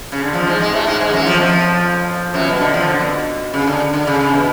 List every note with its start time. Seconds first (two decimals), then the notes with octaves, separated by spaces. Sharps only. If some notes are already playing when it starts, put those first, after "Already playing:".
0.12 C#3
0.23 D3
0.34 F2 F3
0.47 G#2 G#3
0.60 G#2 G#3
0.74 A2 A3
0.87 G#2 G#3
1.00 G#2 G#3
1.13 F#2 F#3
1.27 F2 F3
1.40 F2 F3
2.34 F#2 F#3
2.46 B2
2.60 D3
2.74 F2 F3
2.88 D3
3.01 B2
3.54 C#3
3.67 D3
3.94 D3
4.07 C#3
4.20 C#3
4.34 B2